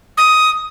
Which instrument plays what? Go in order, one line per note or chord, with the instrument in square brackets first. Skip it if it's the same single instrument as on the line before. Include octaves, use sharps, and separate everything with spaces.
[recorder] D#6